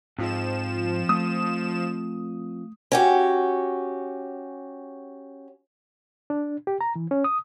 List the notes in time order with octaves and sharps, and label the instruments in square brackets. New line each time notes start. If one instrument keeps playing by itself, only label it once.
[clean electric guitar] F2 [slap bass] G#2 [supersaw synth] F3 E7
[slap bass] A3 [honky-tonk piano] D#6
[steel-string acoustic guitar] C#4 F#4 G4
[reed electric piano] D4
G4
A#5
E3
C#4
D#6